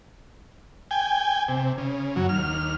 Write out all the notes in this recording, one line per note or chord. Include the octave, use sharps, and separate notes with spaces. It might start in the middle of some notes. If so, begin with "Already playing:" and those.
G5 G#5
C3
C#3
F#2 F#3
D#2 F6